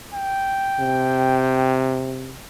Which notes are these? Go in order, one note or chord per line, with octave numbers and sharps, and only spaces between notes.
G5
C3